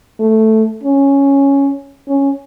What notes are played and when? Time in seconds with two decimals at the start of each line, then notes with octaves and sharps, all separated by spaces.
0.19 A3
0.83 C#4
2.08 C#4